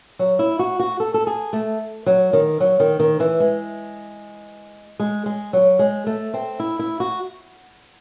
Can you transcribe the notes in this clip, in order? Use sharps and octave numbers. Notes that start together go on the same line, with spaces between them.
F#3
E4
F#4
F#4
A4
A4
G#4
A3
F#3
D#3
F#3
D#3
D#3
E3
G#3
G#3
G#3
F#3
G#3
A3
C4
E4
E4
F#4